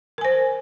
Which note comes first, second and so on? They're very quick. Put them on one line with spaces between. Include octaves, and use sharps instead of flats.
A#4 G#5 C5